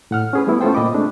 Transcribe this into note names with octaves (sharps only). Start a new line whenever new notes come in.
A2 F#5 F6
C#4 G#4 B4
G3 A3 B3 E4
A3 C#4 F4 A4 C5 G5
A#2 D#5 B5 D6
G#3 A3 C4 D4